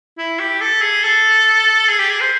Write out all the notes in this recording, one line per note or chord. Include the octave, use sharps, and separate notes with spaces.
E4
G4
A4
G#4
A4
G#4
G4
G#4
C5